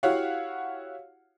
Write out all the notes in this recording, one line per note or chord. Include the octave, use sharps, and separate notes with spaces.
E4 F#4 G4 C#5 F5 F#5